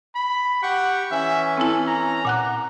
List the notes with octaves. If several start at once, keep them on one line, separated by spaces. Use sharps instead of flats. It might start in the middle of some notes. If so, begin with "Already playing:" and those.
B5
G4 F#5 G5 C#6
E3 C#4 E5
C4 E4 A4
A#5
A#2 F#5 F#6